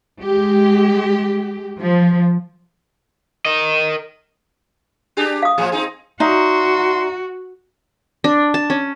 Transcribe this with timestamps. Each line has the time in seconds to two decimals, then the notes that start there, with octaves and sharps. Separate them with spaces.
0.21 G#3 G4
1.80 F3
3.45 A#4 D#5
5.17 D4 G4 G#4
5.43 F5 D#6
5.58 A2 F3 G#4
5.72 C4 D#4 G#4
6.20 D#4 F#4 D5 E5 A#5 C6
8.24 D4
8.54 A5
8.70 C#4